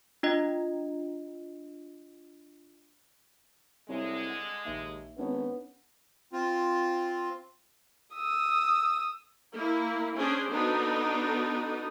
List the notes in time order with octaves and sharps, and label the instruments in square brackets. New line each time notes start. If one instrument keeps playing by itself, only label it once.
[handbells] D4 F4 D#5
[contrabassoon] C2 [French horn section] D3 G#3 [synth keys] C#5 E5
[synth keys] F#5
[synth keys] A#1 E5 [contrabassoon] D#2
[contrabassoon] G#1 [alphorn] B3 [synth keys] C#4 D4 C#5
[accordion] C4 F4
[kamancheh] D#6 E6
[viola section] A#3 E4
C#4 D4 G#4 C5
B3 D4 D#4 F#4 A4